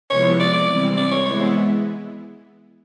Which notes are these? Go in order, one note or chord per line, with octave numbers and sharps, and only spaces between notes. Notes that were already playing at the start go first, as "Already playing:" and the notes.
C3 F3 G#3 B3 E4 C#5
D5
D5
C3 E3 G3 C4
D5
C#5
E3 G#3 B3 E4 C#5
C5